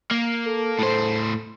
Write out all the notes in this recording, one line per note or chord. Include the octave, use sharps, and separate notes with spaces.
A#3
A4
A2 C5